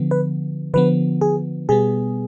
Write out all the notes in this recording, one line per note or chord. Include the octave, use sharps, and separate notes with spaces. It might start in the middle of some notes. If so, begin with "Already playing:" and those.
Already playing: D3 F3 B3
B4
D3 F3 B3 B4
G#4
B2 G3 B3 G#4